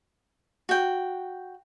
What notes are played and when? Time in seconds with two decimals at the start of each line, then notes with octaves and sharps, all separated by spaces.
0.69 F#4 G5